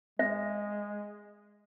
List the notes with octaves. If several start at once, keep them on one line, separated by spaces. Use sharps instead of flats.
G#3 E5